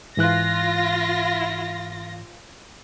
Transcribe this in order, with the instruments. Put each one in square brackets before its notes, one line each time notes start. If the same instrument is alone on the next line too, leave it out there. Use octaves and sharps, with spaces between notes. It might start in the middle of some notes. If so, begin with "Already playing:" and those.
[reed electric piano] G#2 E3 F#6 [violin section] F4 A#6